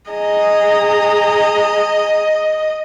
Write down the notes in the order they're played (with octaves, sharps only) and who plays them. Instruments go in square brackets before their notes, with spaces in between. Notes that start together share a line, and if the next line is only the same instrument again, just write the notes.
[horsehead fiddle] G#4 A#5 [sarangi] D#5